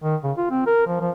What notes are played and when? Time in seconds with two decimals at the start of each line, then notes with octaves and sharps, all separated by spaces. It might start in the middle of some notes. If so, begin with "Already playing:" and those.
0.03 D#3
0.24 C#3
0.37 F4
0.50 C4
0.67 A#4
0.87 F3
1.01 F3